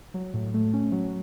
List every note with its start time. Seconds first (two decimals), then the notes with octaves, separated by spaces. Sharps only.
0.14 F#3
0.34 A2
0.54 A3
0.73 C#4
0.92 F#3